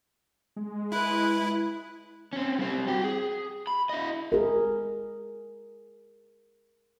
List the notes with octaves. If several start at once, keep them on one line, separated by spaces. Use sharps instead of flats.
G#3
E4 B4 F#6
C4 C#4
G3 C4
F#4 G5
G#4
B5
E4 D#5
G#4 A#4